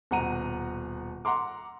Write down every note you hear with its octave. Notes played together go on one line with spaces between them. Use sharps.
D#1 B2 F#5 A#5 D#7
F#5 A#5 C6 D6